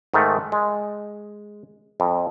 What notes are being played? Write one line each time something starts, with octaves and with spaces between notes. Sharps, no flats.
G#2 D#3 A3
G#3
F2